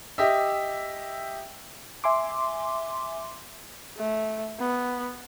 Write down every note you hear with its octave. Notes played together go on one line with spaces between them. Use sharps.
G4 D#5 E5
E5 G#5 C6 D6
A3
B3